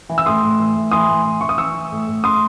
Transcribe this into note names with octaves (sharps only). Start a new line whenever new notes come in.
E3
E6
A2 C6 D#6
A2
E3
A2
E3 C6 D#6
A2
E3
E3 C#6
D#6
E3 C#6 E6
E3
A2
A2
A2 C6 D#6